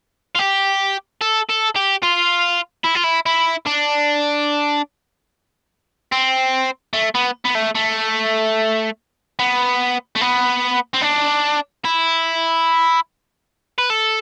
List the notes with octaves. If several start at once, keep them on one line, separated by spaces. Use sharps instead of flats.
F4
G4
A4
A4
G4
F4
E4
F4
E4
E4
D4
C4
A3
B3
B3
A3
A3
B3
A3
B3
C4
D4
E4
B4
A4